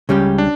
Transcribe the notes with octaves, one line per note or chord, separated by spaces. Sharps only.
C#2 C#3 G3 C#4 G4
D4